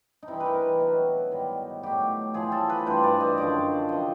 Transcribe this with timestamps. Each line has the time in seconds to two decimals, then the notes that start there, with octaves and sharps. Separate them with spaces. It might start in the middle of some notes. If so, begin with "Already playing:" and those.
0.23 D#4
0.28 C3 E3 G3 E4
0.40 B4
0.46 A#4
0.80 B2 F#3
1.31 G#2 D#3 G3
1.83 A2 F#3 G4
2.34 A2 F3 G#4
2.52 A4
2.70 B4
2.86 G2 E3 G3 C5
3.03 D5
3.20 D#5
3.38 F#2 D3 F3 D5
3.89 C3 F3 D#5